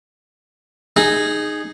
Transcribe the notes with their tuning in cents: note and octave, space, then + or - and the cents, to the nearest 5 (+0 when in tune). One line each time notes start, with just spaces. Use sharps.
D#4 -15 G#4 +0